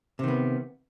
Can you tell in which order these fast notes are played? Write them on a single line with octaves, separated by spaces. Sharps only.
C3 D#3 B3